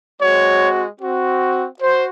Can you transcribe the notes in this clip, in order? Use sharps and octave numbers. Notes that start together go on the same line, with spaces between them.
G#3 C4 F#4 C#5
C4 F#4
F#4 C5